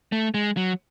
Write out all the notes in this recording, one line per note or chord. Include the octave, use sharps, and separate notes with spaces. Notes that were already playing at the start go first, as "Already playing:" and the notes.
A3
G#3
F#3